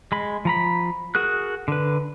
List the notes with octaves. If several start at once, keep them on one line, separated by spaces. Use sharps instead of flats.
G#3 B5
F3 A#5 B5
F#4 G#4 A#4 F#6
D3 B4